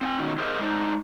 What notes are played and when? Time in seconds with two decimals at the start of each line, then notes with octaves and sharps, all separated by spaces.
0.01 C4 F#5 G#5
0.18 B2 D#3 F#3 C#4
0.38 G4 G#4 A#4 C5 D#5 E5
0.59 G#3 D4 D#4 C5